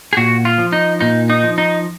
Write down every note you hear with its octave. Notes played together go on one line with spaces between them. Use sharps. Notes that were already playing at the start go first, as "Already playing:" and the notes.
G#4
A#2 F#4
F4
F3
D#4
A#2 D#4
D#4
F3
D#4